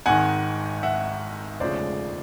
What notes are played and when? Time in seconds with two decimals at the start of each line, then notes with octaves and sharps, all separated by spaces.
0.06 G#1 G#2 D#3 F#5 G#5
0.83 E5 F#5
1.60 E1 D2 C#3 F3 G#3 C5 D5